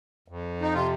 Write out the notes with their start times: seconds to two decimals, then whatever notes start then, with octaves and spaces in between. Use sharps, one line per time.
0.28 F2
0.61 D#4
0.73 C3 F4